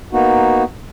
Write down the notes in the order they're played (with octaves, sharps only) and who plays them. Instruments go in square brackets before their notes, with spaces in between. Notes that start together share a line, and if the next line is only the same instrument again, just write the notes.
[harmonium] A#3 B3 D#4 F#4